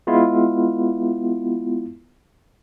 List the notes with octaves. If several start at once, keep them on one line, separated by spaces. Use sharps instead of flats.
G#3 B3 E4 F4